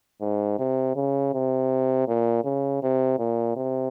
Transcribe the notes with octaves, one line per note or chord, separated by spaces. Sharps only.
G#2
C3
C#3
C3
A#2
C#3
C3
A#2
C3